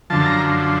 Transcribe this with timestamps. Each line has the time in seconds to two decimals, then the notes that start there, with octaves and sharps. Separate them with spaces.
0.10 F#2 D3 F3 A5
0.26 A#5